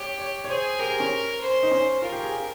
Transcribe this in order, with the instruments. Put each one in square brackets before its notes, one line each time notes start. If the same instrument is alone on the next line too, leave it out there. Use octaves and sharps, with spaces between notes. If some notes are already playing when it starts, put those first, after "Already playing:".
Already playing: [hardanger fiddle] G4 [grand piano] C#5
[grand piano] C#5
C#5
[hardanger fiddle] G#4 [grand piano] C5
[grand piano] G4 [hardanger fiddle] A#4
[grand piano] G#4
C#4
[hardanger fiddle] C5
[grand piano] D#4
C#4
[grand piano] F4 [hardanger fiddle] A#4
[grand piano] G4
G#4
G4